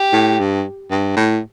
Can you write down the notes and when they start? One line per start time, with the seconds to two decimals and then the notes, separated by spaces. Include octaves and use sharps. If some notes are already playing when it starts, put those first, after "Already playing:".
Already playing: G4
0.13 A2
0.39 G2
0.91 G2
1.16 A2